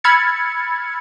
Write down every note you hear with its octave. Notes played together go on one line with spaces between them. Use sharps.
B5 E6 F6 G#6 A6 C#7